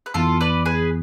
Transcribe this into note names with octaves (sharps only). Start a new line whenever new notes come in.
B4
F2 E3 B3 E4 F4 A4
B4 D5
G#4 B4